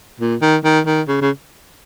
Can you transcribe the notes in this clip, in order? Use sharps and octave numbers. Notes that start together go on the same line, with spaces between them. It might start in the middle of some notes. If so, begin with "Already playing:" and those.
A#2
D#3
D#3
D#3
C#3
C#3